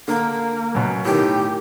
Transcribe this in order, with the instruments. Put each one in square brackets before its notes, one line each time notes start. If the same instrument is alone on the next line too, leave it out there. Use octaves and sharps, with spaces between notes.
[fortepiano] D3 [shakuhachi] A#3
[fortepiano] F#2 B2
[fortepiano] A2 D#3 [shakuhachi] G4